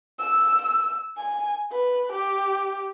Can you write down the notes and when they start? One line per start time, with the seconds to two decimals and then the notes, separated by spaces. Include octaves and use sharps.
0.19 E6
1.17 G#5
1.72 B4
2.12 G4